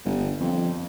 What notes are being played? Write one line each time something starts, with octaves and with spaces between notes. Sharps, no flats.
G1
F2